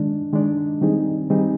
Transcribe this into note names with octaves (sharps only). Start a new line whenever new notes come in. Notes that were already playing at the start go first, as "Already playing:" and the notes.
Already playing: D#3 G#3 D4
D#3 G#3 D4
D#3 G3 C4 D#4 G#4
D#3 G3 C4 D#4 G#4